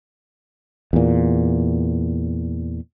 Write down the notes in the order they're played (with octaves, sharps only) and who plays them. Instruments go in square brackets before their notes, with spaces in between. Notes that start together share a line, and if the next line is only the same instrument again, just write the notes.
[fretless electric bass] E2 A#2